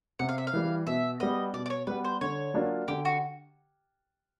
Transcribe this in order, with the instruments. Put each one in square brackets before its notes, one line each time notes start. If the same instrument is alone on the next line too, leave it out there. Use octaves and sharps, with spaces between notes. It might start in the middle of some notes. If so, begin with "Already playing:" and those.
[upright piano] C3 [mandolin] F#5
[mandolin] F5
E5
F5
[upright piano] E3 G3
[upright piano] B2 [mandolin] E5
[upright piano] G3 B3 [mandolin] D#5
[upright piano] B2 [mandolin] D5
[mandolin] D5
C#5
[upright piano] G3 B3 [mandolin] B4
[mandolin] C5
[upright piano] D3 [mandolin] C#5
[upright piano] F#3 A#3 D4 F4
[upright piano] D3 [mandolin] G4
[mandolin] F#4